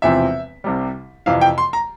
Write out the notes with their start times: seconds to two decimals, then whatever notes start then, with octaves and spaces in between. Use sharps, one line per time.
0.02 E1 E2 C3 F3 C4 E5
0.64 C2 C3 G3
1.26 F2 C3 E3 F5
1.41 G5
1.58 C6
1.73 A#5